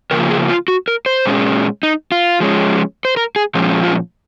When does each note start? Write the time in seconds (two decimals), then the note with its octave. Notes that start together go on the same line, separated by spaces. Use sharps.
0.11 C#3 F3 A#3 A#4
0.30 G#4
0.49 F4
0.68 F#4
0.88 A#4
1.06 C5
1.26 A#2 G#3 C#4
1.83 D#4
2.12 F4
2.40 F3 G#3 C#4
3.05 C5
3.17 A#4
3.36 G#4
3.55 A#2 F3 G#3 C#4
3.83 F4